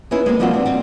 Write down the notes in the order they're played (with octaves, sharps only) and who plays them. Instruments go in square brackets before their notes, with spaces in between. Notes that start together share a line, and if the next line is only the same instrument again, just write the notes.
[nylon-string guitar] B3 C#4 D#4 E4 G#4 B4
G#3 A#3 C4
F3 G3 A#3 C4 F4 F#4
C4 D4 D#4 G4
G3 C4